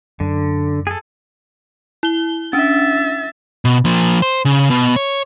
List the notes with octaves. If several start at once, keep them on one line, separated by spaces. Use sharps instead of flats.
F#2 D3
G#4 A4
E4 G7
C#4 D4 E5 A6
B2
F3 A#3
C5
C#3
B2
C#5